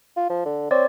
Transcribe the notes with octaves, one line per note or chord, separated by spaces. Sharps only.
F4
F3
D3
C4 C#5 D5